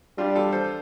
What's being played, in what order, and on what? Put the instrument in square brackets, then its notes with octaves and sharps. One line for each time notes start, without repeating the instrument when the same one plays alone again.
[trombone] G3 [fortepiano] D4 F4
[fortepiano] F4 A4
A4 C5